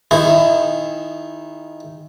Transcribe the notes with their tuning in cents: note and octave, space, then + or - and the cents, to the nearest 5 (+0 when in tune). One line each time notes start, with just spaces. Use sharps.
D#3 +0 E4 +15 G#4 -20